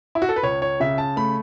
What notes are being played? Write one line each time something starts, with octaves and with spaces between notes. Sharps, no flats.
E4
F#4
A4
B4
C#2 C#5
C#5
C#3 E5
A5
A3 B5